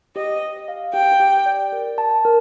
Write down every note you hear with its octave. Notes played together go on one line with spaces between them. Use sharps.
G4 D#5
G4
F5
G4 G5
G4
D5
A#4
A5
A#4